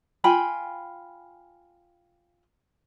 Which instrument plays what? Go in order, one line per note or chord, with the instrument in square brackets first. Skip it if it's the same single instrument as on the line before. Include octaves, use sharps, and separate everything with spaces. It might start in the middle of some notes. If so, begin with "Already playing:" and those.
[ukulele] F4 G5 G#5 B5